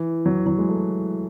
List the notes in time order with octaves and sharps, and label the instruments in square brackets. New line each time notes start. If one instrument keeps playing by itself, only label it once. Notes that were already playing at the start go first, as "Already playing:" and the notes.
Already playing: [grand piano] E3
F#3
F#3
G#3
A3